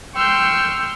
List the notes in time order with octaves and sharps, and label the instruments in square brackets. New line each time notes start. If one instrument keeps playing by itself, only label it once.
[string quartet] G5 C6 C#6 E6 F6 G6